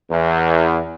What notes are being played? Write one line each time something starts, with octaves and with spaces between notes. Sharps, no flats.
E2